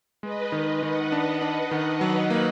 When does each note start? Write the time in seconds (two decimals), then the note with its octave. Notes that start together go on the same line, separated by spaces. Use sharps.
0.23 G#3 B4 D#5
0.52 D#3 B4 D#5
0.82 D#3 D#5 F#5
1.11 D4 D#5 F#5
1.42 D4
1.71 D#3
2.01 F#3
2.30 A#3